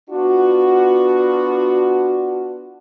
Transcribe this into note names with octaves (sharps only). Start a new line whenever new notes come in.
B3 D4 F4 F#4